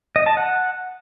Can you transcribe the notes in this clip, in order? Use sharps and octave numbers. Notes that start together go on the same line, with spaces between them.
D#5
A5
F#5